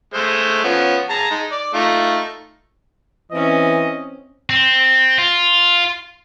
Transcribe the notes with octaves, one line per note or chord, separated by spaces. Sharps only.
G#3 A3 C5
F3 B3 C#4
G#4 A5 A#5
G#3 D#4
D5
A3 D#4 F4
E3 C4 C#4 D#5
C4
F4